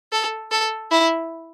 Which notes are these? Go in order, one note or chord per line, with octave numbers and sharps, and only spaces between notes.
A4
A4
E4